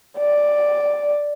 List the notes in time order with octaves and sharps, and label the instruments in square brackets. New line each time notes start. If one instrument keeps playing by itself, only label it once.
[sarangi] D5